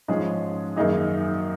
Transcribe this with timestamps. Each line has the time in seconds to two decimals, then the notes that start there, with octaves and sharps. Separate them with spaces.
0.08 G#2 F3 G#3 C#4 G#4
0.76 F#2 D#3 A#3 D#4 G#4